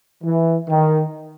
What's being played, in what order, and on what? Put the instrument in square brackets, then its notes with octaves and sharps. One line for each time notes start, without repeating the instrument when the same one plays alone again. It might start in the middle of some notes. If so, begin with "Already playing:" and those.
[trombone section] E3
D#3